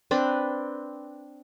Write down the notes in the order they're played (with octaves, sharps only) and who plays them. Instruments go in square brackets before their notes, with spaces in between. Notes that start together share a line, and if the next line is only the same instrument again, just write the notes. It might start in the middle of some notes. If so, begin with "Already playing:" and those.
[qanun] C4 D4 B4 B5